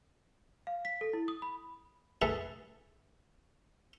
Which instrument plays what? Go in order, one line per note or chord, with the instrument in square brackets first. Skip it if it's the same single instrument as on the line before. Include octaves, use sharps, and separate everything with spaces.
[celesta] F5
B6
A4
E4
D#6
B5
[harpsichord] A3 E4 G#4 A4 B4